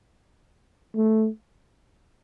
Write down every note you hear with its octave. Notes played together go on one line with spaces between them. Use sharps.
A3